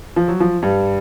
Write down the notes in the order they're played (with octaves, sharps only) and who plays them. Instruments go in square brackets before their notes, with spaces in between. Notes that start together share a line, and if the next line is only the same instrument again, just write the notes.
[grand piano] F3
F#3
F3
G2 G3